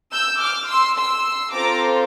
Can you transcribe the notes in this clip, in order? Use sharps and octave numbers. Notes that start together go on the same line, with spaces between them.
E6 G6
D6 F6
C6 E6
C6 E6
C4 F4 A4 A#5 D6